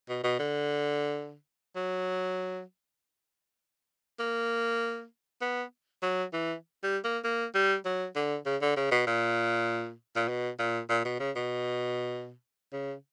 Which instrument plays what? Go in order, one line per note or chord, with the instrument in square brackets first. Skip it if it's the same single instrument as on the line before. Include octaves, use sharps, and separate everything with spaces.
[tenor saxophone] B2
B2
D3
F#3
A#3
B3
F#3
E3
G3
A#3
A#3
G3
F#3
D3
C#3
D3
C#3
B2
A#2
A#2
B2
A#2
A#2
B2
C#3
B2
C#3